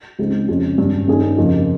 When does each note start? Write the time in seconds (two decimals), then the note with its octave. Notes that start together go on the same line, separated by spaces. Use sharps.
0.19 C#2 C#3 G#3 C4 D#4
0.48 F2 C#3 G#3 C#4
0.78 G#1 G2 G3 C#4
1.08 G2 D#3 G3 C#4 G#4
1.37 F2 C#3 F3 A#3 D#4